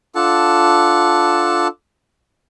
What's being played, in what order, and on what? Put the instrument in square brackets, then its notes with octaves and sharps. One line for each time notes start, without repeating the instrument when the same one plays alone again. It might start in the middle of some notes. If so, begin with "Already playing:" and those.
[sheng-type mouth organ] D4 F4 A4 F#5 A5